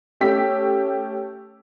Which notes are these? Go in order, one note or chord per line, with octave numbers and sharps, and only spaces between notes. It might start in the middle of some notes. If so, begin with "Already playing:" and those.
A3 C#4 G4 E6 B6